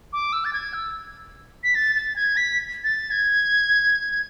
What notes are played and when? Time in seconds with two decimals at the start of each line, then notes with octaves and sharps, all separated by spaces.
0.13 D6
0.33 E6
0.45 A6
0.53 G#6
0.74 E6
1.64 B6
1.75 A6
1.95 A6
2.16 G#6
2.37 B6
2.84 A6
3.11 G#6